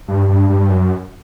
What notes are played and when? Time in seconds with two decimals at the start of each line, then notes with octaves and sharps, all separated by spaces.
0.08 G2
0.28 G2
0.49 G2
0.70 F#2